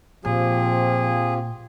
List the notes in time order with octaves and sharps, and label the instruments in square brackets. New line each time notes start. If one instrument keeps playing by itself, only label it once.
[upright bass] A#2 [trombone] F3 [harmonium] C4 F4 G4 [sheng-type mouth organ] G#4